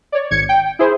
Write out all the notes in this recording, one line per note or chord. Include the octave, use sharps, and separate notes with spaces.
C#5 D5
G#1 G#6 C#7
G5
E4 G#4 C5